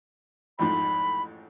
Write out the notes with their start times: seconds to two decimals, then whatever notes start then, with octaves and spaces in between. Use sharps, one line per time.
0.59 A1 F2 G#2 B5